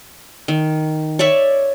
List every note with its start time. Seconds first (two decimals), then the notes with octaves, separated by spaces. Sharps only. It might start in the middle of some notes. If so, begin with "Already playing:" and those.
0.48 D#3
1.19 C#5 D5 E5 C#6